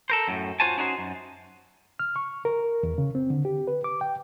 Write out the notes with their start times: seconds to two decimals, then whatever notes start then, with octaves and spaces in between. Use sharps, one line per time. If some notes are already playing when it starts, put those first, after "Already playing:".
0.10 A4 A#4 C5
0.28 F#2 A2
0.60 F4 F#4 C5 C#5 G#5 A5
0.78 C#4 D#4 F#4 C5
0.98 F#2
1.99 F6
2.16 C#6
2.45 A#4
2.83 E2
2.98 C#3
3.15 C4
3.30 D3
3.45 G4
3.67 B4
3.84 D6
4.01 G5